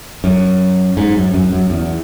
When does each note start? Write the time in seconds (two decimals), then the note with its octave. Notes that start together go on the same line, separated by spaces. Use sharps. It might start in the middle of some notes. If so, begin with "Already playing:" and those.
0.24 F#2
0.97 G#2
1.16 F#2
1.34 F#2
1.52 F#2
1.70 E2